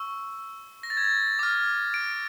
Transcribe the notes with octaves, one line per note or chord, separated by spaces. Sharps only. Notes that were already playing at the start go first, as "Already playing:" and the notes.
Already playing: C#6 E6
A#6
A6
G#6
A6
D6 F6
D7